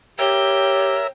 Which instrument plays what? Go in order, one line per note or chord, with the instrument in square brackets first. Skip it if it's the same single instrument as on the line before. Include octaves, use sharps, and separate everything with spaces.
[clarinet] G4 [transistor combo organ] A#4 E5 [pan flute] C#5 [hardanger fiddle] G5